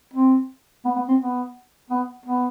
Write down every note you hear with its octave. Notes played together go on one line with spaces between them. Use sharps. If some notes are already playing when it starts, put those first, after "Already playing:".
C4
B3
B3
C4
B3
B3
B3